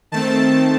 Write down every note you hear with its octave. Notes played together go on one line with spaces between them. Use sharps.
D#3 A3 C4 A5